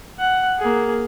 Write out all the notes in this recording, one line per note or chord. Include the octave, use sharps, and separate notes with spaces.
F#5
A#3 G#4